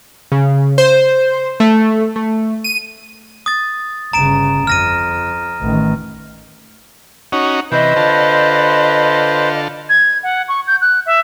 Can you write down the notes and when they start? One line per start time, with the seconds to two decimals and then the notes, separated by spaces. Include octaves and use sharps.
0.32 C#3
0.78 C5
1.60 A3
2.16 A3
2.64 D#7
3.46 D#6 A6
4.13 G1 C#3 A#5 D7 E7
4.67 F2 F6 A#6 D#7
5.62 A1 D#3
7.32 C#4 D#4 F#4
7.72 C3 E3 B4 C5 D#5
7.96 D3 F4 A4
9.89 G#6
10.23 F#5
10.48 C#6
10.67 G6
10.81 F#6
11.06 E5